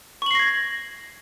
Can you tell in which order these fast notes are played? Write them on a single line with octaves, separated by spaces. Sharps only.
C#6 F#7 C7 A#6 G#6